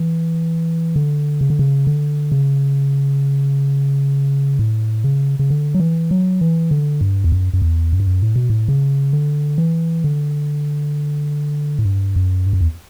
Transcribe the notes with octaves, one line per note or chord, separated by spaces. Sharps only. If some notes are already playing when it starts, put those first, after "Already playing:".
Already playing: E3
D3
C#3
D3
C#3
D3
C#3
A2
C#3
C#3
D3
F#3
E3
F#3
E3
D3
G2
E2
F#2
F#2
E2
F#2
G2
F#2
A2
B2
A2
C#3
D3
E3
D3
A2
G2
F#2
G2
F#2
E2